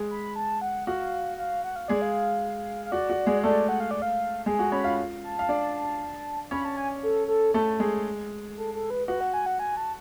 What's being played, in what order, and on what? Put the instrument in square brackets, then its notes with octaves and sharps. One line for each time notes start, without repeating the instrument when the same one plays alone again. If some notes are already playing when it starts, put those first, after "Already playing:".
Already playing: [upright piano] G#3 G#4
[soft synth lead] B5
A5
F#5
[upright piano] F#4 [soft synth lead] F5
[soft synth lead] F5
F#5
F5
[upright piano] G#3 G#4 [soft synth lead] D5
[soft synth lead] F5
F5
[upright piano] F#4 [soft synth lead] D5
[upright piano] F#4
G#3 G#4
[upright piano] A3 A4 [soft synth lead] D5
[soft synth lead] F#5
F5
D5
F5
[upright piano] G#3 G#4 [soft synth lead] G#5
[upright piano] F#4
[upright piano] C#4 C#5 [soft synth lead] B5
[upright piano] F4 F5
[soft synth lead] A5
[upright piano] F5
D4 D5
[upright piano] C#4 C#5 [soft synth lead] B5
[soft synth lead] A5
G#5
A4
A4
[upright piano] A3 A4
G#3 G#4
[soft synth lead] A4
A4
B4
[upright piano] F#4 [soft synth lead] B4
[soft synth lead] F#5
G#5
F#5
G#5
A5